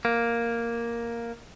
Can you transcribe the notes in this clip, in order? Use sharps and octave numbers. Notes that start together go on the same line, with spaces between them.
A#3